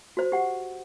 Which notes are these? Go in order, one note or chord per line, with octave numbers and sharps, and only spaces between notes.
F#4 C5
G4 F#5